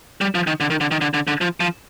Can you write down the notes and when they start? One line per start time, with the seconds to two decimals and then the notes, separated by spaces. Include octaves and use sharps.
0.21 G3
0.35 F3
0.47 D#3
0.60 D3
0.70 D#3
0.81 D3
0.91 D#3
1.01 D3
1.14 D3
1.27 D3
1.41 F3
1.60 F3